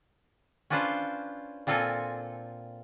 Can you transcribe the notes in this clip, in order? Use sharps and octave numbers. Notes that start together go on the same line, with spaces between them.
C#4 D4 F4 B4 C5 F5
A#2 C4 F4 A4 G#5